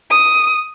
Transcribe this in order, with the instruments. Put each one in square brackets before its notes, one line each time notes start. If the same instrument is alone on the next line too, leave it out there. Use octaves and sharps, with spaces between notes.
[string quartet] D#6